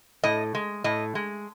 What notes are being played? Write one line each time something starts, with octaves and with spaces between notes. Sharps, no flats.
A2 D#5
G#3
A2 D#5
G#3